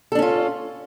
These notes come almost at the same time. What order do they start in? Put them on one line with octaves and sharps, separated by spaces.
A4 D4 C#4 F4